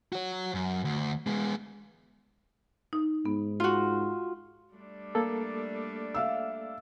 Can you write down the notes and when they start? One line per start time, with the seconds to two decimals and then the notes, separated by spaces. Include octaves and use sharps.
0.12 F#4 C#5
0.54 F#2
0.85 D2
1.27 G#3 B3
2.93 D#4
3.26 G#2 B3
3.60 F4 F#4
4.75 G3 A3 D4
5.15 A#3 A4
6.14 E5 F5 E6